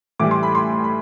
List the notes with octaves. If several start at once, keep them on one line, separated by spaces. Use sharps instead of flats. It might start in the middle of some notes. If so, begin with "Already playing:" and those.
A2 E3 G3 D6
C6
B5
C6
B5